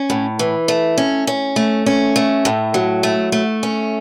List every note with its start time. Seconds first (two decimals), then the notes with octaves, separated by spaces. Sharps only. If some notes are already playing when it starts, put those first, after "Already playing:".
Already playing: C#4
0.10 A2
0.39 E3
0.68 A3
0.98 C#4
1.27 C#4
1.56 A3
1.86 C#4
2.16 A3
2.45 A2
2.74 F#3
3.03 A3
3.32 A3
3.63 C#4